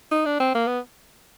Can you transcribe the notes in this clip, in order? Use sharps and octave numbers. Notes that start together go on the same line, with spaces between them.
D#4
D4
C4
A#3
B3